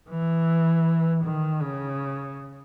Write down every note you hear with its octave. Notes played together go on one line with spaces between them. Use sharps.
E3
D#3
C#3